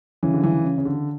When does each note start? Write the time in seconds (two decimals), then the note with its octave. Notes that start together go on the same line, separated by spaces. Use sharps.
0.23 C#3 E3
0.34 D3
0.43 C#3 E3
0.64 C#3
0.78 C#3
0.85 D3